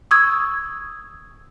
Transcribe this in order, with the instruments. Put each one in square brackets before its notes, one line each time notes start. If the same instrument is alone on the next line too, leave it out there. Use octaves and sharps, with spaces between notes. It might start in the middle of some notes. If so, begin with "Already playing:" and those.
[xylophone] C#6 D#6 E6 G#6